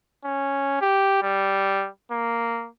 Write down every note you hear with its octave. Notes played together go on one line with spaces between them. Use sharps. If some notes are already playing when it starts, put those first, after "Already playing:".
C#4
G4
G3
A#3